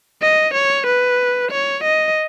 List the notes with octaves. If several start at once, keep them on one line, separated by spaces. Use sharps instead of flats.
D#5
C#5
B4
C#5
D#5